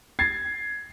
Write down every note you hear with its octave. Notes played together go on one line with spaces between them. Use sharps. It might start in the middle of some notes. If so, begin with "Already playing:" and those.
G#6 A6 C7